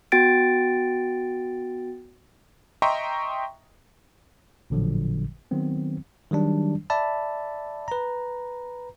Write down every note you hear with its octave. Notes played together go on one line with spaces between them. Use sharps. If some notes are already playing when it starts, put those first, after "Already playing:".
B3 F#4 G5 A6 D7
D#5 E5 G5 A#5 C6 C#6
A1 A#2 D3 F3 F#3
D#3 F#3 B3 C4
D#3 F#3 G3 D4
D5 E5 A5 B5
B4 A#5